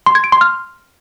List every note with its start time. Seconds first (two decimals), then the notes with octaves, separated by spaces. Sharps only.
0.06 C6
0.15 G#6
0.24 D7
0.32 C6
0.41 F6